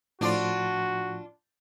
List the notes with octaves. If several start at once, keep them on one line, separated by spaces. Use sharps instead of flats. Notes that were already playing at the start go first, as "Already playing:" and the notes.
A2 F3 D4 F4 F#4 D5 C6